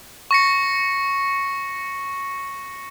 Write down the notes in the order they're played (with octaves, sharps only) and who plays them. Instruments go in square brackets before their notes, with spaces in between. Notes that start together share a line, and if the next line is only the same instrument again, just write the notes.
[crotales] C#6 A#6 C#7